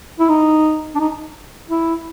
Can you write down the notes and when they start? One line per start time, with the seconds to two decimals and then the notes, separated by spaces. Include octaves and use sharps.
0.19 E4
0.29 D#4
0.95 D4
0.99 D#4
1.70 E4